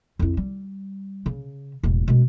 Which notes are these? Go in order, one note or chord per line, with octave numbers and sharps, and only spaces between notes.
F2 E4
G3
C#3
E1 A1
B2 G#3